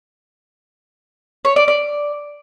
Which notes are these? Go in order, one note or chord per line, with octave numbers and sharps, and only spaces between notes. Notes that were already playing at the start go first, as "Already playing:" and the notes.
C#5
D5
D5